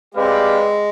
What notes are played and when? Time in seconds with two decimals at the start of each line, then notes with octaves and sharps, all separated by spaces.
0.14 G#3 C4 G4 B4 D5 F5